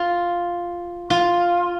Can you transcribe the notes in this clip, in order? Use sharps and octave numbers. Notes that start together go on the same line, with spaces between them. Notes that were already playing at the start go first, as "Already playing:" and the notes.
Already playing: F4
F4